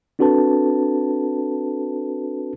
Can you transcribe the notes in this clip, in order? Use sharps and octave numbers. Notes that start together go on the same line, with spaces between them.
C4 D4 F#4 A4 B4 A5